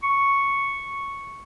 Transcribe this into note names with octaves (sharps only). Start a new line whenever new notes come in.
C#6